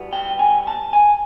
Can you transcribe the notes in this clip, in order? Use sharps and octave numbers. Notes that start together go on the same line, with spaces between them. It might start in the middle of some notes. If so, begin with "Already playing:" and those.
Already playing: B2 G3 B3 E4
G5
G#5
A5
G#5